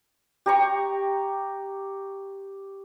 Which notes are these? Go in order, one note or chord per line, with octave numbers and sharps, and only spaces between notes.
G4 A#5 C#6